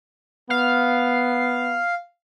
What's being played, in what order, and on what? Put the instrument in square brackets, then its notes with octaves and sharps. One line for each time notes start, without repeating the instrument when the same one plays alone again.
[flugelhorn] B3 [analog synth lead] F5